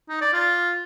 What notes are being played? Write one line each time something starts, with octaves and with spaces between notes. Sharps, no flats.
D#4
D5
F4